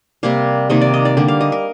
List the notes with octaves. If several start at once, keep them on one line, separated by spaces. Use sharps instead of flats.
C3 G3 A#3 F5
C3 D#3 A#3 D#5
D5
D#5
D5
D3 G3 A#3
F5
D#5
A#4